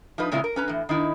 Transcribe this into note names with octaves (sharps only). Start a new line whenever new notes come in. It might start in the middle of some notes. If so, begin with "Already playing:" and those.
F3 D#4 B4
A#2 C#3 G#3 C4 E4 F4
A#4
C#4 B4 A#5
A2 E3
D#3 D#4 E4